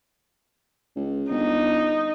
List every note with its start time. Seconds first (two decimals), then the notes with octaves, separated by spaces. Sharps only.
0.96 C#2
1.31 G1 D#4